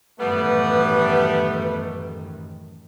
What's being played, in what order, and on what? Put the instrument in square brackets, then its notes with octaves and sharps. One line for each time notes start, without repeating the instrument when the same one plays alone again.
[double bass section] A1 F#2 D#3 [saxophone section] G3 B3 [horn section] A3 [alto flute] B4